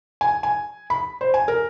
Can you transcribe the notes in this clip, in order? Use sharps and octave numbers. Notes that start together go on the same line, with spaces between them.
G#5
G#5
B5
C5
G#5
A#4